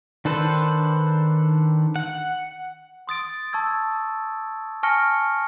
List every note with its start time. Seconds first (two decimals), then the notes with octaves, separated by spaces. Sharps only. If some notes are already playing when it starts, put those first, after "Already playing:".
0.25 D#3 D4 A4 B4 C5
1.96 F#5
3.07 C6 D#6 A6 D7
3.53 A5 C#6 E6 G#6
4.83 G#5 A5 C#6 F6 A#6 C#7